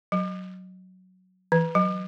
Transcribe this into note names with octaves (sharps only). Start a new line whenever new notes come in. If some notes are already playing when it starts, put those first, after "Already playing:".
F#3
E3
F#3